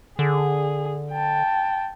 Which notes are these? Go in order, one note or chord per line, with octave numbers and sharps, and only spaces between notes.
D3 G#4
G5 A5